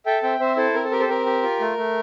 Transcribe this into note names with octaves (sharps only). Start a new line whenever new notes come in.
A4 E5 G5
C4 E5 G5
C4 C5 E5
E4 A4 C5
C4 A#4
A4
G4 A#4
A4 C5
C4 A#4
G4
F4
A3
A3